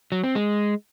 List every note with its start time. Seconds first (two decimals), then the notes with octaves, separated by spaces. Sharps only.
0.12 F#3
0.24 C4
0.35 G#3